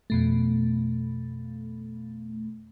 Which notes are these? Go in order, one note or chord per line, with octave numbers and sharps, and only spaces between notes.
F2 B2 A3